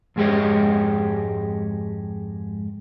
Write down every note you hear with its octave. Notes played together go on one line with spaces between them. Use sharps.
F2 G#2 G#3 G4 C#5 D#5